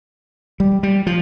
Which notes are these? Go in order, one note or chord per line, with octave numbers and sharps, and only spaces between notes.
G3
G3
F3